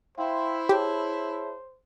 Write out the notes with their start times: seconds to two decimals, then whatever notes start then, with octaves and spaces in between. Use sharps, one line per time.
0.18 E4 C5 F5 G5 C6
0.69 G4 G#4 C#5 A5